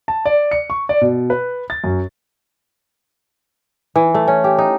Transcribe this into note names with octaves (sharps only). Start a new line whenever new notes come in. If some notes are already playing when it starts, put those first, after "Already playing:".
A5
D5
C#7
C#6
D5
B2
B4
A6
F#2
E3
A3
C#4
G4
D#4